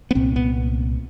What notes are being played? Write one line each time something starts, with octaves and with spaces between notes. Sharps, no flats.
B3
C2 A#2 C4
B3